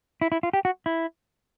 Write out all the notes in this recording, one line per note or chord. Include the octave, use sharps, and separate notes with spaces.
E4
E4
F4
G4
F#4
E4